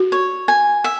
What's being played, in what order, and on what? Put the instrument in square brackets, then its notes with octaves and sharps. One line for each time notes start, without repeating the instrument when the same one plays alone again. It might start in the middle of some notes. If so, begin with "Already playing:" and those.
Already playing: [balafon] F#4
[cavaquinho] C#5
G#5
E5